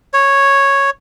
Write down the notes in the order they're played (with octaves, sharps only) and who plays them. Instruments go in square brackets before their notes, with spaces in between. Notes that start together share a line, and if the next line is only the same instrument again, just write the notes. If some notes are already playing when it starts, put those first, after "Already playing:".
[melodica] C#5